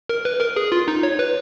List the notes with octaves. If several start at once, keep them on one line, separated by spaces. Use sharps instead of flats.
A#4
B4
A#4
G#4
F4
D#4
C#5
B4